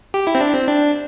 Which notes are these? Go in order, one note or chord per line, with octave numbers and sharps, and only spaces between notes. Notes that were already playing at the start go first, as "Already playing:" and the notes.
G4
E4
C4
D4
C4
D4